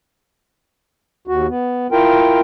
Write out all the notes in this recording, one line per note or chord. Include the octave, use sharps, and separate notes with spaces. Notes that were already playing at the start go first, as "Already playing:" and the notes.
D#2 F#4
B3
E4 F4 A#4 G5